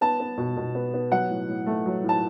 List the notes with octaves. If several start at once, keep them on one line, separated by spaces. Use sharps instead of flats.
B3 A5
B3
B2
B2
B3
B3
F#3 F#5
A2
A2
A3
F#3
A2
A5